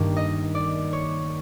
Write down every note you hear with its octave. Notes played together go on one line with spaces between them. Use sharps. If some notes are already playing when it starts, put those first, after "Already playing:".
Already playing: G2 D#3 G3 A#3
D#5
D5
C#5